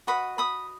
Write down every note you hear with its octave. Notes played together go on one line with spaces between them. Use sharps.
F#4 B4 D#5 B5 D#6
B5 D#6